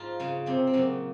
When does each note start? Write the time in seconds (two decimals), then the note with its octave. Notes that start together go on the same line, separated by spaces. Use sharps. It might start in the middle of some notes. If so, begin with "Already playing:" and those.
Already playing: G#2 F3 D#4 F4
0.20 C#3 C#4
0.46 C3 C4
0.67 C4
0.73 A#2 C#3 F#3 C#4